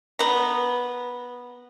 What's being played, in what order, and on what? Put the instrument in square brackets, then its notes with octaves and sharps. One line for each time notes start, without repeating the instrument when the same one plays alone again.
[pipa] B3 A#5